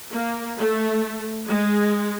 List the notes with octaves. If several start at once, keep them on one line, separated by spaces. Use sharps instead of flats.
A#3
A3
G#3